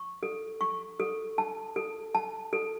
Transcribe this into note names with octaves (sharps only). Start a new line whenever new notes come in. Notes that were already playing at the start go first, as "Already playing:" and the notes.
Already playing: C#6
A4
C#6
A4
A5
A4
A5
A4